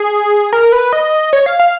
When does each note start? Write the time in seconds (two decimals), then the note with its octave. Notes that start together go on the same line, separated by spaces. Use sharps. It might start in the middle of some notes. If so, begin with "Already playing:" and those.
Already playing: G#4
0.53 A#4
0.72 B4
0.93 D#5
1.33 C#5
1.46 F5
1.60 F5